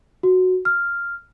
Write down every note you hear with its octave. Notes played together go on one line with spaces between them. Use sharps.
F#4
F6